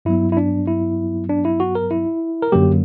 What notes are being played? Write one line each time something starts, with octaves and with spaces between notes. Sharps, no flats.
G2 F#3 B3 E4
E4
D4
E4
D4
E4
F#4
A#4
E4
A#4
F#2 D3 F#3 A#3 G4